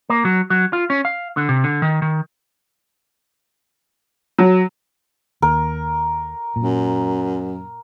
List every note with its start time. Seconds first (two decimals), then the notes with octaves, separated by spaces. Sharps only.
0.10 A#3
0.25 F#3
0.50 F#3
0.73 F4
0.90 C#4
1.05 F5
1.37 D3
1.49 C3
1.64 D3
1.82 D#3
2.02 D#3
4.38 F#3
5.42 D#2 A#4
6.56 F#2 A#2